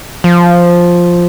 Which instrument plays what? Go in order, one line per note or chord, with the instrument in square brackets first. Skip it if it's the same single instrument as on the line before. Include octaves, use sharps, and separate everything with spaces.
[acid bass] F3